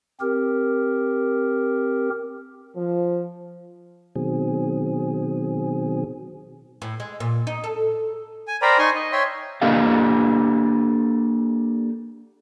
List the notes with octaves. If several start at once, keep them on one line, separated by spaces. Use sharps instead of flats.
C4 G4 A#4
F3
B2 D#3 F#3 C4 G#4
A2
G#3
A#2
D#4
A4
G#5
A#4 C5 D5 G5 A#5 B5
D#4 G#5 C6 C#6
D#5
C#5 E5 G5 C6
A#3 D4 G4 A4 D#5 F5